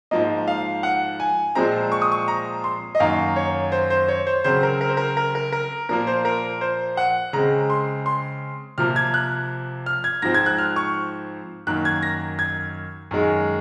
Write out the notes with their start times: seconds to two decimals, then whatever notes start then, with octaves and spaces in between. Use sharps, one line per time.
0.11 G#2 F3 A#3 D#5
0.48 F5
0.83 F#5
1.20 G#5
1.55 A#2 F3 G#3 C4 A#5
1.92 C#6
2.02 D#6
2.12 C#6
2.28 A#5
2.64 C6
2.95 D#5
3.00 F#2 D#3 A#3 F5
3.36 C#5
3.72 C5
3.90 C5
4.08 C#5
4.27 C5
4.44 C#3 F#3 C4 C5
4.63 A#4
4.81 A#4
4.89 C5
4.97 A#4
5.17 A#4
5.35 A#4
5.53 A#4
5.89 A#2 F3 A#3 A#4
6.07 C5
6.25 A#4
6.61 C5
6.97 F#5
7.33 C#3 G#3 C4 A#5
7.70 C6
8.06 C6
8.78 C3 F3 A#3 F6
8.96 G#6
9.14 F#6
9.86 F6
10.04 G#6
10.22 G#2 F3 C4 A#6
10.34 G#6
10.46 F#6
10.58 F6
10.76 C#6
11.67 F#2 D#3 A#3 F#6
11.85 G#6
12.03 A#6
12.39 G#6
13.11 F#2 D#3 G#3